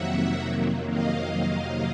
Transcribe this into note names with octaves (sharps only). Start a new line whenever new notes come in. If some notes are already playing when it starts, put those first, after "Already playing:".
Already playing: F2 C3 D#3 F#3 A#3 E5 F#5
D#5 F5